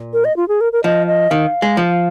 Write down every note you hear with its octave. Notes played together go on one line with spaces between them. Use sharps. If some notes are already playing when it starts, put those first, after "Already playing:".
Already playing: A#2
A#4
D#5
F4
G#4
A#4
A#4
F3 D#5
D#5
D#3 F5
G#3
F3